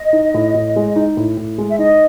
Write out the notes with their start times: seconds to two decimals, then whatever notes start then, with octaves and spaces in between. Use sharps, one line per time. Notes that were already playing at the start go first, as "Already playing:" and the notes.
Already playing: D#5
0.13 D#4
0.34 A2
0.54 A2
0.76 G#3
0.96 D#4
1.17 A2
1.37 A2
1.58 G#3
1.70 E5
1.79 D#4 D#5